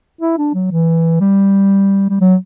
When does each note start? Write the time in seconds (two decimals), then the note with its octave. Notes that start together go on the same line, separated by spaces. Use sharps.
0.21 E4
0.38 D4
0.54 F#3
0.72 E3
1.21 G3
2.10 G3
2.21 F#3